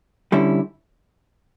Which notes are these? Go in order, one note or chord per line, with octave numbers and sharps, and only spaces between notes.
D3 G3 C#4 E4